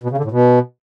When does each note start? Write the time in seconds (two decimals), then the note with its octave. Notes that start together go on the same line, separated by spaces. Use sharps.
0.04 B2
0.11 C#3
0.17 D3
0.24 A2
0.31 B2